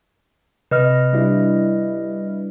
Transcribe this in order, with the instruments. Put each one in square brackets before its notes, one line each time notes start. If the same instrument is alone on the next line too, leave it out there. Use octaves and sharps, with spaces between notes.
[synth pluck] C3 [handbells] B4 D#5 F6
[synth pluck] G3 D4 E4